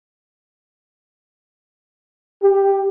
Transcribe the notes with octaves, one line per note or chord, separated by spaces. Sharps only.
G4